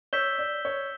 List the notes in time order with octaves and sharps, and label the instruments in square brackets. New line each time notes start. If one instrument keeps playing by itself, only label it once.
[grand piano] C#5 [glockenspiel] E6 G6 B6 E7 G7
[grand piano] D5
C#5